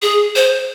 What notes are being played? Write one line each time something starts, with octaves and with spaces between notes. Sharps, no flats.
G#4
C5